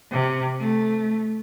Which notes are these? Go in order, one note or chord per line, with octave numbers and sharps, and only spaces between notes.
C3
A3